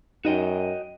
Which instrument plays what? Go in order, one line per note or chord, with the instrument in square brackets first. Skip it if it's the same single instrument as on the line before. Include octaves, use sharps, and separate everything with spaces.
[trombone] F#2 [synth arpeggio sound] D#4 [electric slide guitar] F#4 D#5 G5